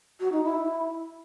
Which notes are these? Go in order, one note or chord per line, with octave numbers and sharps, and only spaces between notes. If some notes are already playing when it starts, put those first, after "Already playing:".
F#4
D#4
E4